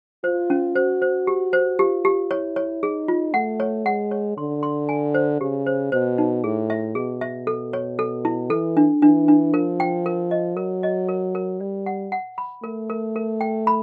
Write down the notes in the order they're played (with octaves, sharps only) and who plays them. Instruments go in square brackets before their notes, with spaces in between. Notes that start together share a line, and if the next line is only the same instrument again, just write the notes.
[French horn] F4 [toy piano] C5
[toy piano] C#4
[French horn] F#4 [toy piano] C5
[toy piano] C5
G4
C5
[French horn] F4 [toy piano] G4
[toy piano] G4
[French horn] E4 [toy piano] C#5
[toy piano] C#5
[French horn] D#4 [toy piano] G#4
[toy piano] F4
[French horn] A3 [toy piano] F#5
[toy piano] C#5
[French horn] G#3 [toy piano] F#5
[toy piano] C#5
[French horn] D3 [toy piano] C6
[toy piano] C6
G#5
C5
[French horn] C#3 [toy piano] G4
[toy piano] C5
[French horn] B2 [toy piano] C5
[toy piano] D#4
[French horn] A2 [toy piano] G#4
[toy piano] E5
[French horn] B2 [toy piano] G#4
[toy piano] E5
A4
C#5
A4
E4
[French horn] E3 [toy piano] A4
[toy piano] D4
[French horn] E3 [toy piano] D4
[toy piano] D4
[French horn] F3 [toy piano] A#4
[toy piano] G5
A#4
D#5
[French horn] F#3 [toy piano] A#4
[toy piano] D#5
A#4
A#4
[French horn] G3 [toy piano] D5
[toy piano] F#5
F#5
B5
[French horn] A3 [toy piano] A#4
[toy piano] A#4
A#4
G5
B5